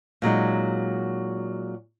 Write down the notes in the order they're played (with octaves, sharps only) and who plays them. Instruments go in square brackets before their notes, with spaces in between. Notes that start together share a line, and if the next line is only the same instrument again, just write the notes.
[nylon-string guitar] A#2 F#3 G#3 D#4